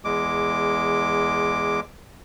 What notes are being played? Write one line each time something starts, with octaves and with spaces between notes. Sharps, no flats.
E2 G#3 D6